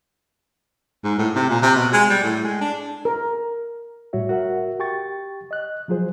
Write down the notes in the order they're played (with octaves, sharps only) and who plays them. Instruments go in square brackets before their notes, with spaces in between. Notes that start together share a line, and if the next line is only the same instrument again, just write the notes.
[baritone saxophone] G#2
A2
C3
A#2
C3
B2
G#3
G3
A2
G#3
D4
[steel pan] A#4
[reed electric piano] A2 G3 F#4 C#5 E5
F#4 A#4 E5 F#5
G4 G5 C#6 A6
D#5 F#6
F3 F#3 F4 G#4 C5